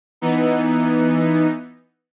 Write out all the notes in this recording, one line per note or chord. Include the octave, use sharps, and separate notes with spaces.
E3 B3 D#4